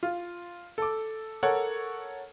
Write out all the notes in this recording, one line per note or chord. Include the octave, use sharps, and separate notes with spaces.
F4
A4 D6
A4 A#4 C#5 F#5